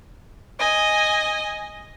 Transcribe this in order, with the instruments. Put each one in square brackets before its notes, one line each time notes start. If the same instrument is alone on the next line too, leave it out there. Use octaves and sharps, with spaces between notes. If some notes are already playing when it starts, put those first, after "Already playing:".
[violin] D#5 G#5